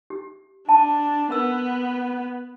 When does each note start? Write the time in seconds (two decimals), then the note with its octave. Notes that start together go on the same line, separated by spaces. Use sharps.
0.10 G4
0.69 D4 A5
1.31 B3 A#4 E6